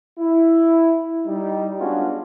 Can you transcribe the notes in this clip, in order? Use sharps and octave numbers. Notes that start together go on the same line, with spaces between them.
E4
G3 D#4
G#3 B3 C#4 D4 F4 F#4